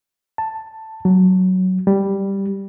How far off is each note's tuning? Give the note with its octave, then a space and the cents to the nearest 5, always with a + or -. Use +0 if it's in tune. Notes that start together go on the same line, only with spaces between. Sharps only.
A5 +5
F#3 +5
G3 +0